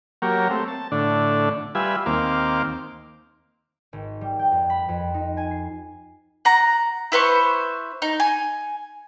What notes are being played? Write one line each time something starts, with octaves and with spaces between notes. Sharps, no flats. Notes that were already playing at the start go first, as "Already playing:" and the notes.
F#3 A#3 G4 A#4 C#5
A3 C4
A5
A2 D3 D4
G3 F4 B4 E5 G#5
D#2 A#3 C4 F5 D6
G#1
G3
G5
F2
B5
F2
D#4
G#5
C7
F#5 A#5
E4 B4 C5 C#6
D#4
G#5